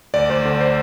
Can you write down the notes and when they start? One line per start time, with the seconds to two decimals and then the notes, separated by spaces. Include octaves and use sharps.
0.14 D2 D5
0.30 D2 C5
0.45 D3
0.61 C5